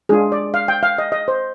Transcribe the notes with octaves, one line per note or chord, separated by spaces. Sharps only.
G#3 D4 F4 G#4
D5
F5
G5
F5
D#5
D#5
C5